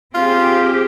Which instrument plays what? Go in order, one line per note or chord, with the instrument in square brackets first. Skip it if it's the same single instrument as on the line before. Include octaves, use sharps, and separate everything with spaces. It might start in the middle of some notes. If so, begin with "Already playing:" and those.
[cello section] C4 G4 G#4 [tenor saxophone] F4